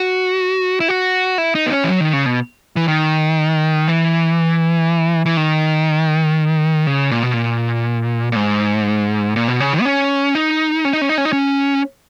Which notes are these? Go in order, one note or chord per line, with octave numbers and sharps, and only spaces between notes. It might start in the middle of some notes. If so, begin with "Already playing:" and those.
Already playing: F#4
E4
F#4
E4
D#4
B3
C#4
E3
F#3
D#3
C#3
B2
E3
D#3
E3
E3
D#3
C#3
A#2
B2
A#2
A#2
G#2
A#2
B2
C#3
D#3
B3
C#4
D#4
C#4
D#4
C#4
D#4
C#4
D#4
C#4